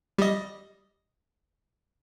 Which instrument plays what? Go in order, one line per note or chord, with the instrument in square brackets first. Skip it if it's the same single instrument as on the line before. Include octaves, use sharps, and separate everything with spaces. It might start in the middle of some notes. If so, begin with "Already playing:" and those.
[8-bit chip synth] G3 D#5